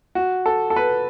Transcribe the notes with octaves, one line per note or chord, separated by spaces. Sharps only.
F#4
A4
A4
B4